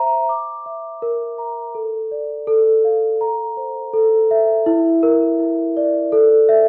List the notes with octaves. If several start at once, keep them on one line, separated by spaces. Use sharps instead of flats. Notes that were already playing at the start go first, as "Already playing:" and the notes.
Already playing: C5 E5 A#5
D6
E5
A#4
A#5
A4
D5
A4
F5
A#5
C5
A4
E5
E4
A#4
E4
D5
A4
E5